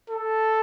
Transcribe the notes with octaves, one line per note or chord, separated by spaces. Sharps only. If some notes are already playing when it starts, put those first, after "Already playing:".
A4